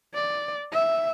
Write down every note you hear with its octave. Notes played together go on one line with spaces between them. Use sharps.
D5
E5